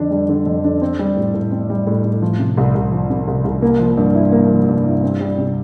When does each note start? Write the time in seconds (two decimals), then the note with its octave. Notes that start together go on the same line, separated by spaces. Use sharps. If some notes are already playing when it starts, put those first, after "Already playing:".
Already playing: F2 D3 D4
0.11 G3
0.29 D3
0.46 F2
0.64 D4
0.82 C4
0.99 G3
1.17 A2
1.34 A2
1.52 C4
1.70 G3
1.87 A2
2.04 A2
2.22 F3
2.39 C3
2.57 C2
2.75 C2
2.92 F3
3.10 C3
3.28 C2
3.44 C2
3.62 A#3
3.79 F3
3.97 G2
4.15 E4
4.32 A#3
4.50 F3
4.68 G2
4.85 E4
5.03 C4
5.21 G3
5.38 C3